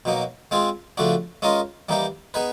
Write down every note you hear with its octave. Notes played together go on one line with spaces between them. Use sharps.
B2 F#3 A#3 D#4
G#3 C4 F4 G#4
C#3 F3 A3 D4 F#4
G#3 C#4 F4 A#4 D#5
E3 G3 A#3 D#4 G4
B3 D#4 G#4 B4